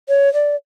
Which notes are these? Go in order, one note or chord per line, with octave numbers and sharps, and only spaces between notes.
C#5
D5